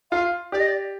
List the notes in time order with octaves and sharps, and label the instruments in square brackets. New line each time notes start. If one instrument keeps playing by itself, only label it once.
[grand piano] F4 [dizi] F5
[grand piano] G4 [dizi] D5
[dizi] D#5
D5